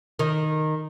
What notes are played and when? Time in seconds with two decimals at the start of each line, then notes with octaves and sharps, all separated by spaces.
0.19 D#3